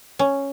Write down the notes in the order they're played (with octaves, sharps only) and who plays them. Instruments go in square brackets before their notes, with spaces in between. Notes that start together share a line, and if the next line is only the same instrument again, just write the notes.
[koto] C#4